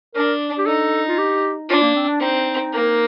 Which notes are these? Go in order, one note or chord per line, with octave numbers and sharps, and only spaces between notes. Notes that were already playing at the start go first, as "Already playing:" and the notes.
D4 A#4
G4
D#4 A4
F4
G4
D4 F4
A#3
C4
D4
C4 D#4
A#3